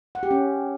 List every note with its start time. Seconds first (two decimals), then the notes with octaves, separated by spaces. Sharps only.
0.15 F#5
0.23 G4
0.31 C#4